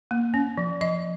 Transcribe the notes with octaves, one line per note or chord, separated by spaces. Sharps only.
A#3
C#4
F3
F3 D#5